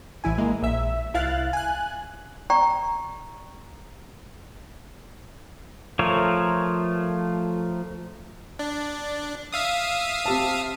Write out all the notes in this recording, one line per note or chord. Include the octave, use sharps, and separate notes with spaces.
A1 E3 E4 G#5
G#3 A#3
A#1 E5
C2 E4 F5 F#6 A6
G#5 F#6
D5 G5 A#5 C#6
F3 A3 F4 A#4 C#5
D4
E5 F5 D#6
C4 G4 A5